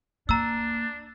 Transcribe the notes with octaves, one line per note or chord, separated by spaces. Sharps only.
A#3 D4 A#5 E6